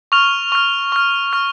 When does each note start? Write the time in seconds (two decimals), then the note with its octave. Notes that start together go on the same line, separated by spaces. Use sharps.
0.12 C#6 F6 F7
0.52 C#6 F6
0.92 C#6 F6
1.33 C#6 F6